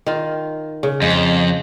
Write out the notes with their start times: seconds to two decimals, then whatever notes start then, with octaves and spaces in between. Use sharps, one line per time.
0.06 D#3 F4
0.83 C#3
1.02 F2 G#3